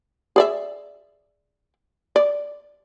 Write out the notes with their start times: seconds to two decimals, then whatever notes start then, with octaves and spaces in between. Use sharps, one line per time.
0.36 G#4 D5 E5
2.16 D5